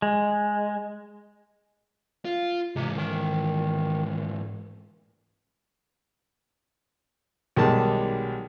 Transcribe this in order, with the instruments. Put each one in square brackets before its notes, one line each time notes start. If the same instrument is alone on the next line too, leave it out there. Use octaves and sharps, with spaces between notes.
[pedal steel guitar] G#3
[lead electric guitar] F4
[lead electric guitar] G#2 E3 [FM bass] C3
[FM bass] D#3
[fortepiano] B1 D#3 G3 G#3 A5